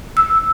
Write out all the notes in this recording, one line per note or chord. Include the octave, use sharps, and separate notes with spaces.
E6